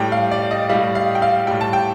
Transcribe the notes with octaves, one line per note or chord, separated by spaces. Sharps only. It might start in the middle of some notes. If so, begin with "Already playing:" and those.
Already playing: A2 G3 G5
F5
D5
D#5
A2 G3 F5
F5
G5
F5
A2 G3 G5
A5
G5